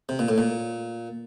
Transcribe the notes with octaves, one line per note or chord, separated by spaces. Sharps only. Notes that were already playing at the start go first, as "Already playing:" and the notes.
C3
A#2
A2
A#2